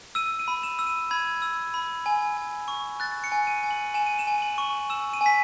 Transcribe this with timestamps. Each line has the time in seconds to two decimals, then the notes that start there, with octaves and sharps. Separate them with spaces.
0.15 E6 D#7
0.39 D#7
0.48 B5
0.63 E7
0.79 E6
0.87 D#7
1.11 B5 G#6
1.42 E6
1.74 B5
2.06 G#5
2.37 G#5
2.68 C#6
3.00 F#6 A6
3.24 C#7
3.32 G#5
3.47 D#7
3.63 G#5
3.71 F#7
3.94 G#5 E7
4.06 D#7
4.19 E7
4.27 G#5
4.42 F#7
4.58 C#6
4.90 E6 E7
5.13 D#7
5.21 G#5
5.26 B6